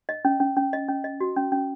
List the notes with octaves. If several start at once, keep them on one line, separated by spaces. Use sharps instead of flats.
D#5
C#4
C#4
C#4
D#5
C#4
D#5
F#4
C#4
C#4